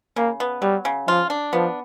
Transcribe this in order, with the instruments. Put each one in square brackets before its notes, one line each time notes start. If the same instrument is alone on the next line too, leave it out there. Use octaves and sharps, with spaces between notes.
[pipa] C#3 [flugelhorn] A#3
[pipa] B3
[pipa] F#3 [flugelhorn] G3
[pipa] C#3
[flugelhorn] F3 [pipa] F4
[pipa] D4
[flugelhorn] F3 [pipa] B3